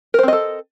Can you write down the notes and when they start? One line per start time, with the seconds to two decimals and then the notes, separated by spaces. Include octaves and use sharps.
0.14 A#4
0.19 C5
0.23 C4
0.28 D#5
0.33 A4